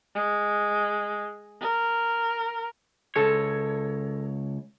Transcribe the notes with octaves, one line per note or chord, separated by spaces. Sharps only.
G#3
A#4
C#2 G#3 A4 C#5